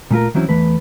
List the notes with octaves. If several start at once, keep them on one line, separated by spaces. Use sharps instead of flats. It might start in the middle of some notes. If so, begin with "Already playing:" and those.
A#2 A3 F4 A#4
E3 F#3 C4 C#4 E4
E2 E3 A3 B4